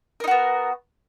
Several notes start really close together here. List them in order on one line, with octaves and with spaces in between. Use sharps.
A#4 D#4 F#4 B3